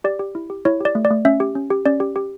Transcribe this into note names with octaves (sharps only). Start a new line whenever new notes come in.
G4 D5
G4
E4
G4
E4 C#5
G4 D5
A3
D5
A3
C#4 E5
G4
C#4
G4
C#4 D5
G4
G4